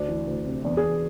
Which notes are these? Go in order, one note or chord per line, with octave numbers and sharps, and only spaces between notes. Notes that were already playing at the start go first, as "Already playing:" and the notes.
Already playing: D2 D4
E3
D2
C3
E2 D4
G#4
E2